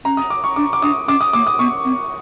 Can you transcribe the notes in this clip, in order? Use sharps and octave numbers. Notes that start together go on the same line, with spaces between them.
C#4 A#5
D#6
D6
C#6
D4 D6
D6
D4 D#6
C#4 D6
D#6
A#3 D6
D#6
B3 C#6
C4